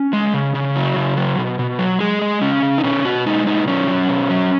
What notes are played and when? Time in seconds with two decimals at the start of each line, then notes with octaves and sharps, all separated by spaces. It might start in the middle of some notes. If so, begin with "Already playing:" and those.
Already playing: C#4
0.13 G#3
0.34 C#3
0.55 C#3
0.76 F#3
0.96 C#3
1.17 F#3
1.38 B2
1.59 B2
1.79 F#3
2.00 G#3 G#4
2.22 G#3
2.42 C#3 C#4
2.62 C#3
2.78 D#4
2.84 B2 C#4
3.05 B2 F#4
3.26 G#3 D#4
3.47 B2 D#4
3.67 F#3 C#4
3.88 F#3
4.09 B2
4.30 F#3